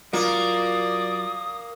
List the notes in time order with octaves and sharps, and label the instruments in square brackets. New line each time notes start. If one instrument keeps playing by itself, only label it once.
[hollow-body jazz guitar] F#3 F4 [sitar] A#3 [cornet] D5 [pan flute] D#6